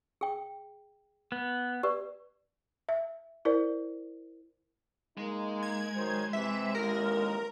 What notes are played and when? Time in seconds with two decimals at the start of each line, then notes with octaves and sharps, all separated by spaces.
0.21 G#4 G5
1.32 B3
1.83 G4 B4 D5
2.89 E5
3.45 E4 A#4 C5 D5
5.18 G#3 A#3 D#4
5.63 G#6
5.96 D#3 F#3 C5
6.33 C3 E3 E5
6.75 A1 D#2 A#4